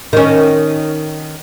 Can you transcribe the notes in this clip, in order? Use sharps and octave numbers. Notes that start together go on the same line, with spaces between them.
D#3 C#4